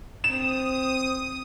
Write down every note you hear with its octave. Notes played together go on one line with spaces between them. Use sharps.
C4 D#6 E7